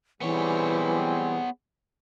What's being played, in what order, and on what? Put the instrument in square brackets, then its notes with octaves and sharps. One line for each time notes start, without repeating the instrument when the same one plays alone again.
[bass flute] E3 [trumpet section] G3 C4 G#4 [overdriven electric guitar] B3 C#5